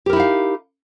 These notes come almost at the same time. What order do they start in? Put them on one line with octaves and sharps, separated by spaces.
G4 A#4 E4 D#4 F5